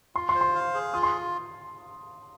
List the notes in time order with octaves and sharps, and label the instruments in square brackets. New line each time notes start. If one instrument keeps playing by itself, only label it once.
[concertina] F4 [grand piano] C6
[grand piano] C6
[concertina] C5
[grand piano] C6
[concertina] F5
G#4
[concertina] F4 [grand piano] D#6
[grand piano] C6